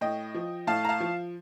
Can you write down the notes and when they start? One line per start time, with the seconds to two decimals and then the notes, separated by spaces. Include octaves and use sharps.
0.01 A2 D#5 G5
0.34 F3
0.67 A2 F5 A5
0.85 A#5
0.89 F5 A5
1.00 F3